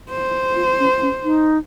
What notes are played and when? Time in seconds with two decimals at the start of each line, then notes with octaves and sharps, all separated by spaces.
0.10 C5
0.56 F4
0.79 C#4
1.01 C#4
1.24 D#4